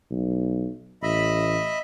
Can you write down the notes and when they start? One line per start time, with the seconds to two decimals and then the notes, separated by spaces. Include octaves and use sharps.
0.11 B1
1.03 A1 D#5 E5 B5